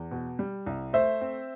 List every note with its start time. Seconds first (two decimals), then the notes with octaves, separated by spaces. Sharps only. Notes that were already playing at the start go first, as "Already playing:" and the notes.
Already playing: E2
0.11 B2
0.39 G3
0.66 C2
0.93 A3 C5 E5
1.21 C4